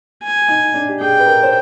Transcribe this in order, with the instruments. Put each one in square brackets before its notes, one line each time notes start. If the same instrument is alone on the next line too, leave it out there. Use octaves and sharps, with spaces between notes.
[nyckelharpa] G#5
[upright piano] D#4
D4
G4
[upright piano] G#4 [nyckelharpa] G5
[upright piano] B4
A#4
C5